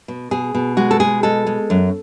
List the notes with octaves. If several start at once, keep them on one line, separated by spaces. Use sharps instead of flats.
B2
B2 G#4
B2
G#3 F#4
A4
B2 G#4
G#3 A4
G#3
F#2